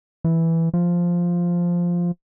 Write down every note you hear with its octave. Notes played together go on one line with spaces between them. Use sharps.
E3
F3